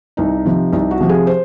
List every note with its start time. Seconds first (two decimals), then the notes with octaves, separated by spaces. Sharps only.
0.17 C2 D#4
0.46 C3 F3
0.73 C2 D#4
0.91 F#4
1.00 C3 F3
1.09 G#4
1.27 C5